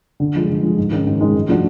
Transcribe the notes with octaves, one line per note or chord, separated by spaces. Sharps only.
D3
F3 G#3
D3
F3 G#3
G#2
D#3 G#3 C#4
G#2
D#3 G#3 C#4
G#2
F3 A3 D4 F#4